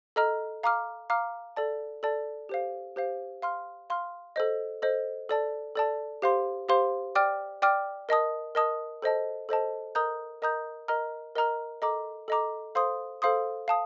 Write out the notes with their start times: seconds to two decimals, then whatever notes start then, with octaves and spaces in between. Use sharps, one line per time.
0.16 A4 D#5 A#5 F6
0.63 F5 A#5 D6 F6
1.10 F5 A#5 D6 F6
1.56 A4 D5 A5
2.03 A4 D5 A5
2.49 G4 C5 F5
2.96 G4 C5 F5
3.42 F5 C6 F6
3.90 F5 C6 F6
4.36 A4 C5 D#5
4.82 A4 C5 D#5
5.29 A4 D5 A5
5.75 A4 D5 A5
6.22 G4 C5 F5 C6
6.69 G4 C5 F5 C6
7.15 D5 G5 D6 F6
7.62 D5 G5 D6 F6
8.09 A#4 D#5 A5 D#6
8.55 A#4 D#5 A5 D#6
9.02 A4 C5 D#5 A5
9.49 A4 C5 D#5 A5
9.95 A#4 D#5 A#5 D#6 G6
10.42 A#4 D#5 A#5 D#6 G6
10.88 A#4 D#5 A#5 F6
11.36 A#4 D#5 A#5 F6
11.82 A4 D#5 A#5 D6
12.28 A4 D#5 A#5 D6
12.75 A4 C5 F5 C6 D#6
13.22 A4 C5 F5 C6 D#6
13.68 F5 A5 D#6